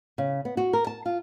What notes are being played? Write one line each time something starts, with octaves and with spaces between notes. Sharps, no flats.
C#3
B3
F#4
A#4
A5
F4